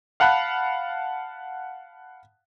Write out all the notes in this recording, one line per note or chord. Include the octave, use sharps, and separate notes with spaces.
F5 F#5 A5 B5 F#6